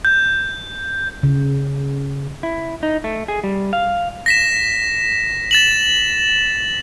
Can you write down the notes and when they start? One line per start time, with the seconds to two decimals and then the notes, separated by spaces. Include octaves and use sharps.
0.05 G6
1.23 C#3
2.43 E4
2.83 D#4
3.04 A3
3.28 G#4
3.44 G3
3.73 F5
4.26 A#6 B6 E7
5.51 A6 E7 F#7